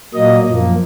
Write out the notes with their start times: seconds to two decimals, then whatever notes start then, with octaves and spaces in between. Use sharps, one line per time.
0.14 A#2 F#3 A#3 D#5
0.46 F#2 F3 A#3